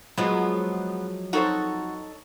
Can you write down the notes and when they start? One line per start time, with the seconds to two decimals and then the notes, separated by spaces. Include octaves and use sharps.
0.18 F3 F#3 G#3 B3 F4
1.33 C4 D#4 F#4 A4 C#5